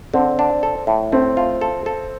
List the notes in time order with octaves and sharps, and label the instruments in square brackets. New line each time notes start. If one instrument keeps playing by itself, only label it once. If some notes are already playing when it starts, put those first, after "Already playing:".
[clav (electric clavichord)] D3 [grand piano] C4
[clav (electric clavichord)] D4
A4
A2
[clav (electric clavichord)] A3 [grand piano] C4
[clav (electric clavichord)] F4
A4
A4